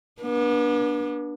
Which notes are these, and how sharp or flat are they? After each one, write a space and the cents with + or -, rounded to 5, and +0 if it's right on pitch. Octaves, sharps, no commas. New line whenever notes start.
B3 -40 D4 +0